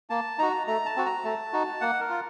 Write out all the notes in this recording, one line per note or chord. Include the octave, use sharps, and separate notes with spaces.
A#3 A5
D#4 F#4 A#5
A3 A#5
A5
C4 F#4
A#5
A3 A5
D#4 F#4
A#3 F#5
A#4
F4